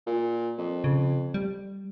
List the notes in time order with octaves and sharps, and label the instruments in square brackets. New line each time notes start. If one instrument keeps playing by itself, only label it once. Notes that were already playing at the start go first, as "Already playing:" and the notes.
[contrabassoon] A#2
F2
[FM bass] C#3
G3